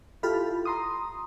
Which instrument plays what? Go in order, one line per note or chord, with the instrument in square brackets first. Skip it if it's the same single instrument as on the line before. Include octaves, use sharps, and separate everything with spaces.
[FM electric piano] E4 F4 G4 A4 F5 B5
A#5 C6 D#6